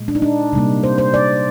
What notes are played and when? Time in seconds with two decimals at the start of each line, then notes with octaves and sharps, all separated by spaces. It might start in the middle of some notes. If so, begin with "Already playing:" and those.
Already playing: A#2 G#3
0.08 D4
0.15 D#4
0.22 D4
0.53 C3 G3 A#3
0.83 C5
0.98 C5
1.14 D5